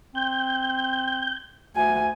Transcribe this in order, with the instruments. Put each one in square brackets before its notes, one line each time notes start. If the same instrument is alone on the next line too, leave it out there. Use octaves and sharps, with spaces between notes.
[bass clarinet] C4 [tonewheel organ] G6
[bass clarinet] D2 [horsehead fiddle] G#5